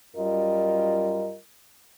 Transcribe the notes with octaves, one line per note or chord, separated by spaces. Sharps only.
F#2 G3 F4 A#4 D#5